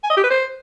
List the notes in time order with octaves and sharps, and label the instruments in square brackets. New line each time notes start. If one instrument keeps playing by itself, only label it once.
[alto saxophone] G#5
D#5
G4
B4
C5